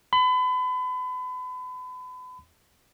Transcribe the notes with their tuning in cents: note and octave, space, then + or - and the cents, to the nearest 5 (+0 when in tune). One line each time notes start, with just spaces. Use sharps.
B5 +35